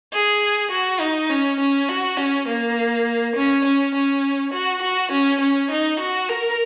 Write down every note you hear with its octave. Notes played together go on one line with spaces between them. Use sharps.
G#4
F#4
D#4
C#4
C#4
F#4
C#4
A#3
C#4
C#4
C#4
F#4
F#4
C#4
C#4
D#4
F#4
A#4